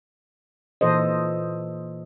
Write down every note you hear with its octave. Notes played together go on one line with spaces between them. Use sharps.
A#2 E3 A4 C5 D#5